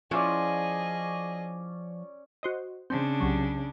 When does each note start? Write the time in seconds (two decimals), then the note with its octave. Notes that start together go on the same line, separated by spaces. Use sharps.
0.11 F3 C#4 E4 F4 G#4 D5 D#5
2.43 F#4 C5 D#5
2.90 C#3 C4 D4
3.20 C2 F#3